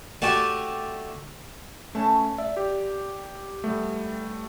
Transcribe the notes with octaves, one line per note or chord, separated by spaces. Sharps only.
A3 F#4 G4 D5 G#5 A5
A3 C#4 B4 C#5 A5
D5 E5
G4
G3 A3 B3